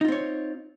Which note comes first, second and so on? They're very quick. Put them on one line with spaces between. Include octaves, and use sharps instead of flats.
D#4 F4 C4 C#5